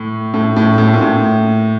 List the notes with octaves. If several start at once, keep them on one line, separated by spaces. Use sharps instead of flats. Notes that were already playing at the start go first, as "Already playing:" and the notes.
Already playing: A2
A2
A2
A2
A#2
A2